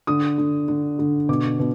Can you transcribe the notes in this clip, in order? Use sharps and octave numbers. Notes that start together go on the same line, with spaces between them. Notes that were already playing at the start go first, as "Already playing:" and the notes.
D3 D#6
D3
D3
D3
B2 D6
B2